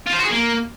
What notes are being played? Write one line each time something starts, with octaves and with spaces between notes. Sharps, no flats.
F4
C5
F#4
G#4
A#3